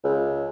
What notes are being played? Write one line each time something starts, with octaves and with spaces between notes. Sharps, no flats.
C#2